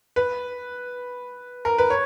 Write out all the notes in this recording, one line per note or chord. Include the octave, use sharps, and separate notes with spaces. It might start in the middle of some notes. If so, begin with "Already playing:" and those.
B4
A#4
B4
C#5